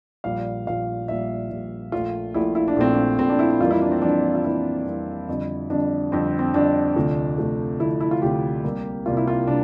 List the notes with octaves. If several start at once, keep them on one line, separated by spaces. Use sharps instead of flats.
A#1 A#2 G3 F5
A#1 A#2 G3 F5
A#1 A#2 G3 E5
A#1 A#2 G3
A#1 A#2 A3 F4
A#1 A#2 A3 E4
E4
D4
A#1 A#2 A3 C4
D4
A#1 A#2 A3 C4
D4
E4
E4
F2 E3 G3 A#3 F4
E4
D4
C4
F2 E3 G3 A#3 D4
F4
F2 E3 G3 A#3 E4
F2 E3 G3 A#3
F2 D3 G3
F2 D3 G3 D4
F2 D3 G3 C4
C4
F2 D3 G3 D4
D2 C3 F3 A3
D2 C3 F3 A3
D2 C3 F3 A3 E4
E4
F4
D2 C3 F3 A3 G4
C2 C3 G3 A#3
C2 C3 G3 A#3 F4
E4
F4
C3 G3 D4